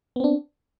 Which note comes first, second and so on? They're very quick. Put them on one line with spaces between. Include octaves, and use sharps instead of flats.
B3 C4 D4